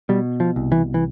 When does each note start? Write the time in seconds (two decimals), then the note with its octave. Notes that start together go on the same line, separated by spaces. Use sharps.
0.09 B2 G3
0.40 F3
0.56 C2
0.72 E3
0.94 E3